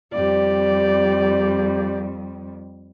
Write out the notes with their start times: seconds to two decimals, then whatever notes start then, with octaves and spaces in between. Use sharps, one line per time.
0.13 F2 G3 G4 D5